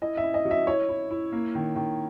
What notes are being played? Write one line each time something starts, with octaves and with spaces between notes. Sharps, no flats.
E4 D#5
E5
E4
D#5
F#3
E5
E4 C#5
E4
E4
A#3
D#3
D#3